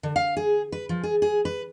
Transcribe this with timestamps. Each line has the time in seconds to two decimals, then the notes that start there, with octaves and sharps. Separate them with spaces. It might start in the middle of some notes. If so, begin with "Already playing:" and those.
0.03 D3
0.16 F5
0.37 G#4
0.72 B4
0.89 F3
1.04 G#4
1.22 G#4
1.45 B4